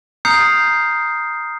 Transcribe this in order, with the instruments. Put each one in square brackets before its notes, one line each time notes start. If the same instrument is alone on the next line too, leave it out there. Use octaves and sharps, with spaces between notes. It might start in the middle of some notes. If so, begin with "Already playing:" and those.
[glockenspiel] A#5 D#6 F6 G6 C7 C#7